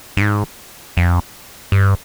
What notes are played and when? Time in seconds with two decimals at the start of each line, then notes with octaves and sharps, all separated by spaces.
0.17 G2
0.21 G#2
0.97 F2
1.72 G2